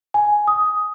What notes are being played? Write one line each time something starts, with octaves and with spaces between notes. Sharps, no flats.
G#5
D#6